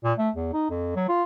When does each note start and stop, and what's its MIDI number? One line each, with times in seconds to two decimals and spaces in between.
0.04 0.13 46
0.18 0.30 57
0.36 0.49 40
0.53 0.70 63
0.70 0.94 41
0.96 1.06 54
1.09 1.24 65